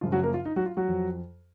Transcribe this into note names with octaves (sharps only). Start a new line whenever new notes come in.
F#2 C#3 F3 F4
F#3 F#4
A#3 A#4
F4
D#4
F#3 F#4
F4
F#3 F#4
F2 F3